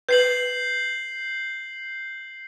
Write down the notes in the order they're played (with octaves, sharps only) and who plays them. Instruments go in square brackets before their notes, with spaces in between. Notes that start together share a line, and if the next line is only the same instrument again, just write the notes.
[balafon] B4 [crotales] G6 C7 F#7